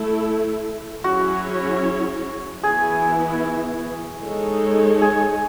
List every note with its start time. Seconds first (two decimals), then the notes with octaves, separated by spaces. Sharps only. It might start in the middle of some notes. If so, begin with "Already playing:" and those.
Already playing: A3 E4 A4
1.04 F#3 C#4 E4 F#4 G#4 C#5
2.63 E3 B3 E4 G#4
4.23 G#3 D#4 A4 C#5
5.01 G#4